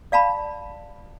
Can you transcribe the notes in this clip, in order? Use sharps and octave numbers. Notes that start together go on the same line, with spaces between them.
D5 F5 A5 B5